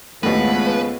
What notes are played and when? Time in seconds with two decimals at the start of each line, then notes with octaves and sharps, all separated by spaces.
0.23 D#2 A2 C#3 F3 G#3 A3 B3 B4